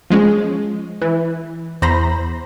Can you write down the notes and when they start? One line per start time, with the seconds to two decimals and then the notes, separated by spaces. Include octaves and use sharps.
0.10 F3 G#3 C#4
1.01 E3
1.82 E2 C5 A#5 B5 A#6